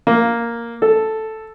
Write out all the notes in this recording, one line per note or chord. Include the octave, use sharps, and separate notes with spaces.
A#3
A4